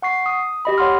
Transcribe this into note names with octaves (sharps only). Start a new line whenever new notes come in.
F#5 C#6 C7
D#6
G4 D#5 B5
C#5 F#5 C6 F6